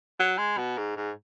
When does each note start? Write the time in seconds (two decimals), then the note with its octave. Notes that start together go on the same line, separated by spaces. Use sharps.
0.20 F#3
0.38 G#3
0.57 B2
0.78 G#2
0.96 G#2